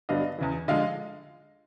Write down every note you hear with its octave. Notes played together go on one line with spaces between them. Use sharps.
G2 D3 F#3 B3 D4 D#5 F5
E2 C#3 E3
D3 F3 G#3 D#5 F5